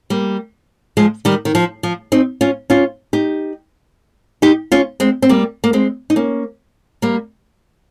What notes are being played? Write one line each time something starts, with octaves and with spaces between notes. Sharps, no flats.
G3 A#3
F3 G#3
D#3 G3
D#3
F3
F3
C4 D#4
C#4 F4
C#4 F4
D#4 G4
D#4 G4
C#4 F4
G#3 C4
C4
G3 A#3
A#3
G#3 C4
D#4
A#3 C#4
G3 A#3